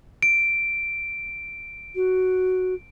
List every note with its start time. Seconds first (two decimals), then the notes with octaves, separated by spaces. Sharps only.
0.23 D7
1.95 F#4